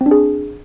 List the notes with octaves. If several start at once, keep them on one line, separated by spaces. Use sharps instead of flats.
C4
D4
G#4